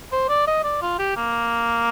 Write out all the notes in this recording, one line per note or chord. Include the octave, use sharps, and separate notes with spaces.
C5
D5
D#5
D5
F4
G4
A#3